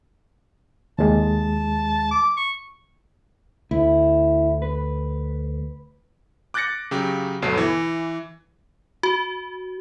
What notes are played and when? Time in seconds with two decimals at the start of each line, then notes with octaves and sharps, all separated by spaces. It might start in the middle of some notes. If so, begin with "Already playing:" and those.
0.98 D#2 G#3 A5
2.11 D6
2.37 C#6
3.71 D2 E4
4.62 B4
6.54 D6 F#6 G6 A6 A#6 C#7
6.91 C#3 F#3 G4
7.42 G1 D2 B2 F#3 A4 C7
7.57 E3
9.03 F#4